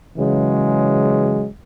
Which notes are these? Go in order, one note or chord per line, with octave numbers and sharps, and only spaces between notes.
C#3 E3 F#3 G#3